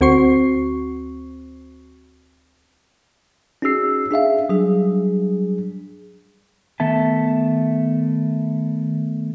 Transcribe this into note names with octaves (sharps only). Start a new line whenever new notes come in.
D2 C4 F#4 C5 C#6 C7
C#4 D#4 F#4 G#4 E6 C7
D4 G#4 E5 F5
F#3 G3 D4 G#4
D#3 A3 B3 E5 A5